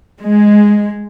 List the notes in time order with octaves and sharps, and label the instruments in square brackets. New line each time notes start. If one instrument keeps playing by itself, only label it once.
[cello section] G#3